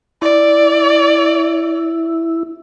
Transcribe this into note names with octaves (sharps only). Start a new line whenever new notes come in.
E4 D5